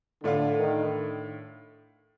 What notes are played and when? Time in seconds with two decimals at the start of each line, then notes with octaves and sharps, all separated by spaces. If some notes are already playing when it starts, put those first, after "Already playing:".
0.23 A2 D3 A3 D4 F4
0.58 D#3